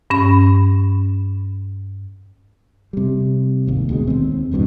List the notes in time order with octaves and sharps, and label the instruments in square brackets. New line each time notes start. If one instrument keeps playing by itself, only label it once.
[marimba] G2 C#4 B5
[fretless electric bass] C3 G3
G#1 D#2
D2 B2 G#3
D#2 C4
F1 A#1 G2 B2